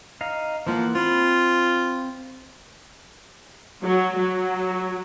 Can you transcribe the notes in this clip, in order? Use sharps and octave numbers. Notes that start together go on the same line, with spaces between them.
D#4 F5
E3 F3 A#3 F#5
C4 F4 B5
F#3
F#3